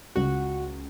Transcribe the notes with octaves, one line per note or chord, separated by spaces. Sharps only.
C#2 F#4